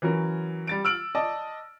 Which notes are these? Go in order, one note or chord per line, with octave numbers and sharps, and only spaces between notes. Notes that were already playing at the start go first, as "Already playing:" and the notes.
E3 F#3 C#4 A#4
G3 A6 D7
E6 F6 D7 F#7
D5 D#5 A5